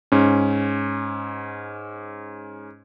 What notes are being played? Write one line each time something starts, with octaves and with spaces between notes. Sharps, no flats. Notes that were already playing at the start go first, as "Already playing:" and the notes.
G#2 C#4